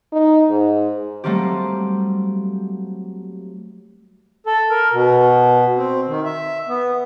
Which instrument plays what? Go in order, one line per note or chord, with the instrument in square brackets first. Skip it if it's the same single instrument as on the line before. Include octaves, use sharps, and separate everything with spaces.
[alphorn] D#4
G#2
[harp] F#3 G3 A3 A#3 C4 G4
[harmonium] A4
A#4
B2
C4
D#3
E5
B3